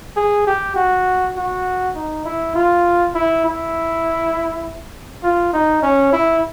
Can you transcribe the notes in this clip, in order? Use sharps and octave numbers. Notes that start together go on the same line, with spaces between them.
G#4
G4
F#4
F#4
D#4
E4
F4
E4
E4
F4
D#4
C#4
E4